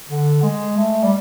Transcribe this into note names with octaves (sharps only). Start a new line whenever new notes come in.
D3
G#3
A3
G3